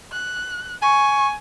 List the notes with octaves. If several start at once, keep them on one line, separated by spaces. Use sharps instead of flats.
F#6
G#5 C#6